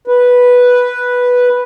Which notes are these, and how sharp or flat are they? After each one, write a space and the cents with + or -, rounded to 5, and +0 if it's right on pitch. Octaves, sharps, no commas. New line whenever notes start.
B4 -5